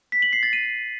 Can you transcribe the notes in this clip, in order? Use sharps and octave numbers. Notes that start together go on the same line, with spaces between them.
B6
F#7
C7
A6
D#7